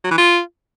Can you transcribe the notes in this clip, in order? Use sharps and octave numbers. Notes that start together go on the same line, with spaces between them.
F#3
E3
F4